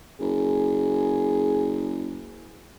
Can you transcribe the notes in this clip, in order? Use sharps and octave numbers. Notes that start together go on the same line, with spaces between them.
F#1 G#4